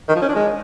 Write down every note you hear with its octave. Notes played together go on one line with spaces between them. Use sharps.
D#3
F3
C#4
D4
G#3